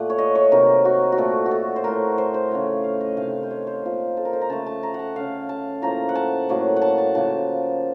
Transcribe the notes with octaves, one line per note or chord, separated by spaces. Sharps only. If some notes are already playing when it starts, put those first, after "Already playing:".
Already playing: A#2 A3 F#5
C#5
D#5
C#5
C3 D#3 F#3 A#3 A#4
F#4
F#4
A#2 A3 A4
F#4
A4
C5
A2 A3 A#4
C5
C5
C#3 F3 A3 C#5
F5
D#5
C3 D#3 A3 F5
C5
C#5
C5
A#2 F3 A#3
A4
A#4
C5
A#5
C#3 A3 A5
A5
A#5
F#5
A5
C#3 A3 F5
A5
A2 F3 A#3 A#5
F#5
A5
A2 F#3 A#3
F#5
A5
A5
C#3 F3 A#3 A5